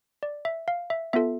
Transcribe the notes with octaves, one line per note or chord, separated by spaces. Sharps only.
D5
E5
F5
E5
B3 F4 A4 E5